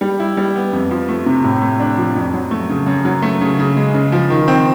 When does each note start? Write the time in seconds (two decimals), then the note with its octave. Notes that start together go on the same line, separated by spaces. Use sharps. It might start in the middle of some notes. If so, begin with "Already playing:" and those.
0.01 G3
0.20 E4
0.37 G3
0.55 B3
0.73 F2
0.91 F3
1.08 A3
1.26 C3
1.44 A2
1.62 A3
1.80 D4
1.97 F3
2.16 F2
2.34 F#3
2.51 A3
2.69 C#3
2.87 F#2
3.05 F#3
3.22 A3
3.41 C#3
3.59 C#3
3.76 G#3
3.94 C#3
4.12 F3
4.30 D#3
4.48 C4